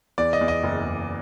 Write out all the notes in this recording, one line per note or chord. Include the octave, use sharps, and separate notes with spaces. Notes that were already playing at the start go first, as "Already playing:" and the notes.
E2 D5
D#5
E2
D#5
F#1
F#1